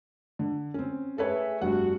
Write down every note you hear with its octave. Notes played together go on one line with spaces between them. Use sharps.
D3
C4 C#4
A3 G#4 A4 B4 C#5 E5
F1 G2 F#4 F#5